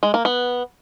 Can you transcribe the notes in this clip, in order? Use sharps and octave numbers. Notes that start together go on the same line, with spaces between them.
G#3
A#3
B3